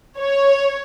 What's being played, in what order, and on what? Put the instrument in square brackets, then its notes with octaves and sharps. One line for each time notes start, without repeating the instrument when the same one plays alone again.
[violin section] C#5